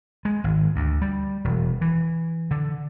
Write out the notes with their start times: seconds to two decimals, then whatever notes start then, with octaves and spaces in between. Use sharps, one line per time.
0.25 G#3
0.44 G#1
0.76 D2
1.02 G3
1.44 E1
1.81 E3
2.51 D3